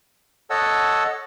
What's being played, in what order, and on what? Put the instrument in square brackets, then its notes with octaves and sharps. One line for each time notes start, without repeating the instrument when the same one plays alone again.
[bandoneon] A4 C#5 D#5 F#5 A5 E6